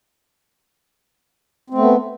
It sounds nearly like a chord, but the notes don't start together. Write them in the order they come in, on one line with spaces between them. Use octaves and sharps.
C4 A3 B3